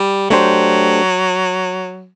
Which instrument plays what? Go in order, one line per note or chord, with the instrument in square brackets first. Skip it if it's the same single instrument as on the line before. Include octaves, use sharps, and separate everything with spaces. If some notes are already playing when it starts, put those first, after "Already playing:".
Already playing: [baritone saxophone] G3
[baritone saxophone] F#3 [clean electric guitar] A3 D4 G4 C5